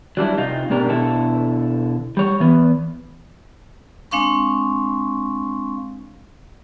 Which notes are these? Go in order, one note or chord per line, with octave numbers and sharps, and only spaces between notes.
F#3 G3 D4 E4
C3 D#4 F4
G#2 B2 D4 G4 A#4
B2 D3 E4 A4
G3 C#5
E3 B3
G#3 C4 D4 F5 C6 C#6